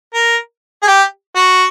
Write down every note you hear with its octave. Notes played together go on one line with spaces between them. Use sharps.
A#4
G#4
G4
F#4